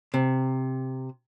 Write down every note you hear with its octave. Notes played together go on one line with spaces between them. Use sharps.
C3